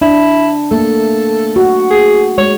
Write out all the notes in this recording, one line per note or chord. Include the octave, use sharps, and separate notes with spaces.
D4 E4
A3 A#3 A4
F#4
G#4
G#3 C#5